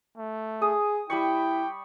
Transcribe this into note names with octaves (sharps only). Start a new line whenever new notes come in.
A3
G#4 D#6
G3 E4 G5 B5 C#6